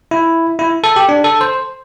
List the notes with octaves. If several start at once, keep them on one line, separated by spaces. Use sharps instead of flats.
E4
E4
A4
G4
D4
A4
C5